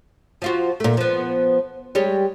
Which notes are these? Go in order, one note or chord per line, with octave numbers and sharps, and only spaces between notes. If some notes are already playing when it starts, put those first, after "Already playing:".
F3 F4 F#4
A#2 A3
F3 B3
G3 G#3 C#5